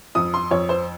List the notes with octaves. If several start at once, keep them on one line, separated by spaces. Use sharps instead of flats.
F2 D#6
C6
F2 C#5
C5